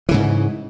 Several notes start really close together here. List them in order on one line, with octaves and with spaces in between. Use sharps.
E3 C#3 G#2